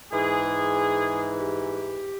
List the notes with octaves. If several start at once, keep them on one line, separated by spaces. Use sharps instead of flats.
G#2 E3 G#4
G4